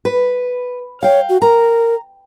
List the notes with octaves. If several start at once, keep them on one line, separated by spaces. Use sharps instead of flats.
B4
C#5 F5 G5
F#4
A#4 A#5